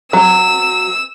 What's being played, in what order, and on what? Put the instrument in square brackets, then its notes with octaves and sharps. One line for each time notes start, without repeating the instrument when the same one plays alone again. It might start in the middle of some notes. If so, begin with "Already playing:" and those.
[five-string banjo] F#3 [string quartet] E6